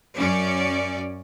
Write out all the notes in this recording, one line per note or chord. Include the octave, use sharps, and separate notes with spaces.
F#2 C#4 D5